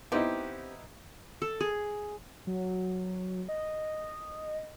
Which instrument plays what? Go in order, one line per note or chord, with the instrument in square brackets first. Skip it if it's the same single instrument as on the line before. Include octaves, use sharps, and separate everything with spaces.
[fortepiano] B3 D#4 E4 [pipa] C4 G4
[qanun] A4
G#4
[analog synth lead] F#3
D#5